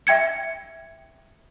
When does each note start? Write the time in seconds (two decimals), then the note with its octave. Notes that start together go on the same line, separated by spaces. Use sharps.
0.07 E5 G5 G#6 C#7